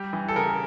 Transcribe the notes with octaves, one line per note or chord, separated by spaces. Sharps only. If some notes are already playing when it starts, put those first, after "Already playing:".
Already playing: G3 G4
E3
A4
C#3 A#4